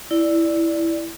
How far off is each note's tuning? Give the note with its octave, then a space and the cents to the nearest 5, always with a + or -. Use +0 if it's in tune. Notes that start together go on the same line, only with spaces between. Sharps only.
E4 +0 D5 +0